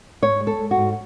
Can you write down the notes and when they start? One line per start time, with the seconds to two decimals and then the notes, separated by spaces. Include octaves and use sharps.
0.22 G#2 C#5
0.40 G#3
0.47 A4
0.59 G#3
0.71 F#4
0.77 G#2